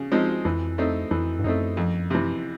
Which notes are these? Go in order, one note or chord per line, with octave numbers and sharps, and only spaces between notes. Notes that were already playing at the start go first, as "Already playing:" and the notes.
Already playing: C#3
F3 G#3 C4 D#4
F2 E3
A3 C4 D#4
F2 E3
G2
F#2 A3 C4 D#4
F2
C3 E3